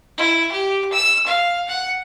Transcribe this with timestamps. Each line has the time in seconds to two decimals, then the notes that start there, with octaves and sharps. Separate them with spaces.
0.18 E4
0.52 G4
0.92 E6
1.26 F5
1.68 F#5